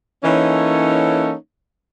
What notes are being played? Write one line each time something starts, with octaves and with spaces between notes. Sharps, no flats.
E3 A#3 C#4 D#4 A4 C#5